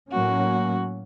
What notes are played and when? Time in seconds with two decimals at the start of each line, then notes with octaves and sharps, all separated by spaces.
0.11 A2 F#3 A#3 C#4 F#4